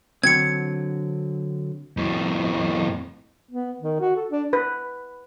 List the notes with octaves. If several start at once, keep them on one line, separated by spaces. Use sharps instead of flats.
D3 F#3 C4 G#6 C#7
F2 A2
B3
D#3
F#4
A4
D4
B4